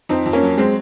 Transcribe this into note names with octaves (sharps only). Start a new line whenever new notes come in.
F2 C4 D#4
F2
A#3 C#4
F#3
G#3 C4